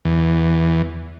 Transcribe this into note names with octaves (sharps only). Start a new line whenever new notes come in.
E2